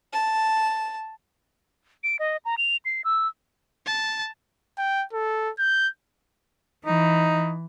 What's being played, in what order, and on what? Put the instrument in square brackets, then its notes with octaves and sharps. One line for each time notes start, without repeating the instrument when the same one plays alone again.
[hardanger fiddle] A5
[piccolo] D7
D#5
A#5
F7
C7
E6
[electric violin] A5
[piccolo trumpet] G5
A4
G6
[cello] E3 [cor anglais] D#4